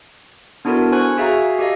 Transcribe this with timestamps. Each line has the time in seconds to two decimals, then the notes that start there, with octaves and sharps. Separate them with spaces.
0.65 B3 D4 E4 F#4 A4 A#4
0.92 C5 G#5 C#6 F#6
1.18 F#4 G#4 E5 F5 G#5 A#5
1.59 G4 A4 D#5 F5